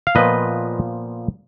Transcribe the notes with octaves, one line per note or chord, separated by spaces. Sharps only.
F5
A#2 F3 B3 B4 D#5